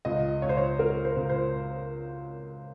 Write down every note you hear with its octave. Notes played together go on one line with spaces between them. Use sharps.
C#2 D#5
C#2 C#5
C5
C#5
C#2 A#4
C5
C#2
C5